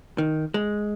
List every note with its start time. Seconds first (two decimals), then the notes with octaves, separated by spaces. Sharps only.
0.18 D#3
0.54 G#3